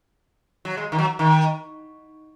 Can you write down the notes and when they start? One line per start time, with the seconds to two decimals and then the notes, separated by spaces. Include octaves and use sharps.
0.65 F#3
0.77 G#3
0.92 D#3
0.98 F#3
1.19 D#3